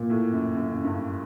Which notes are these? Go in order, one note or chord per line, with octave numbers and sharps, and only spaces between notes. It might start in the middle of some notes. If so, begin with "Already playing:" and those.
Already playing: A#2
A2
F#2
F#2
F#2
G2